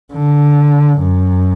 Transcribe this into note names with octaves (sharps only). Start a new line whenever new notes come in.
D3
F#2